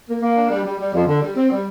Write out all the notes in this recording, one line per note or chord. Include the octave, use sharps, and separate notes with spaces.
A#3
A#3
D4
G3
G3
G3
F2
D3
G3
C4
G3